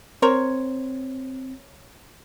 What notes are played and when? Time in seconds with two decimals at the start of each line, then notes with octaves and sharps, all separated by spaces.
0.22 C4 A#4 C5 C#5